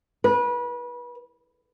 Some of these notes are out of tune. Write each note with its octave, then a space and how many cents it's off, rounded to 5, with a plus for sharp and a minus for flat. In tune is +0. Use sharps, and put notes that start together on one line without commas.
B4 -30